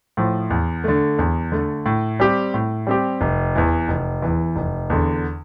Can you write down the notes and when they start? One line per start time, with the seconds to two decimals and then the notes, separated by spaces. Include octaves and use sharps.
0.17 A2 F3
0.50 E2
0.84 D3 A3
1.19 E2
1.52 D3 A3
1.86 A2
2.20 G3 C4 G4
2.54 A2
2.87 G3 C4 G4
3.21 F1
3.55 E2 E3
3.88 F1
4.22 E2 E3
4.56 F1
4.90 E2 D3